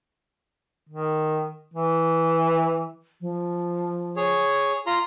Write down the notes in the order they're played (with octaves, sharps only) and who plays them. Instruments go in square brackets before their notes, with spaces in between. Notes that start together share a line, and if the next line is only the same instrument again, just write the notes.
[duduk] D#3
E3
[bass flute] F3
[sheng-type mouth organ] G#4 C#5
F4 A#5 C6